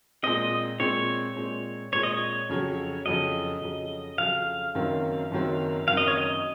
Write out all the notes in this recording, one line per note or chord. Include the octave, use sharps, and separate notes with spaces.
A#2 G#3 C4 D#5
A#2 G#3 C4 C#5
A#2 G#3 C4
A#2 G#3 C4 C#5
D#5
C#5
F2 C#3 F#3
F2 C#3 F#3 D#5
F2 C#3 F#3
F2 C#3 F#3 F5
F#1 F#2 D#3 F#3 C4
F#1 F#2 D#3 F#3 C4
F#1 F#2 D#3 F#3 C4 F5
D#5
C#5
D#5